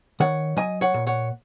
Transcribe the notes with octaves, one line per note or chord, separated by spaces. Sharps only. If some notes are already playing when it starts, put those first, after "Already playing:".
D#3 C#5 F#5
F#3 D#5 G#5
C#5 F#5
A#2
C#5 F#5